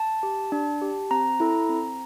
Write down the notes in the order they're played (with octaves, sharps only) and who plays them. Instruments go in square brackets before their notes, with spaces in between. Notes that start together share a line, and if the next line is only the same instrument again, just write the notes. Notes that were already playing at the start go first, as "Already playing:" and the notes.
Already playing: [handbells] A5
G4
D4
G4
C4 A#5
E4 A4
C4